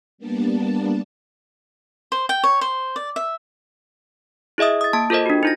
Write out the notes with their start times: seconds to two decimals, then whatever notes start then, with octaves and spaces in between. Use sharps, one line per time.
0.18 G3 A#3 B3 D4 A5
2.12 C5
2.29 G5
2.44 C#5
2.61 C5
2.96 D5
3.16 E5
4.58 E4 G#4 D#5 E5 D#6
4.81 D#6 A6
4.93 A#3 A5 A6 D7
5.10 F4 A4 A#4 C5 D#5
5.26 D4 F#4
5.43 D#4 F4 A#6